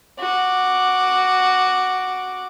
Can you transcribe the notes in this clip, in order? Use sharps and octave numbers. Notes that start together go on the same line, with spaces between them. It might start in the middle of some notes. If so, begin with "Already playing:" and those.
F#4 D6